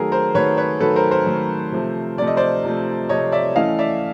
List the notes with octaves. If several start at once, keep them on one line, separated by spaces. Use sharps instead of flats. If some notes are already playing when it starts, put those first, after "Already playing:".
Already playing: D#3 F#3 A3 G#4 A#4
A#4 C5
D#3 F#3 A3 B4 C#5
B4 C#5
D#3 F#3 A3 A4 B4
A#4 C5
A#4 C5
D#3 F#3 A3
C3 F3 A3
C3 F3 A3 D5
D#5
C5 D5
C3 F3 A3
C3 F3 A3 C#5 D#5
D5 E5
E3 A3 C#4 E4 D#5 F5
D5 E5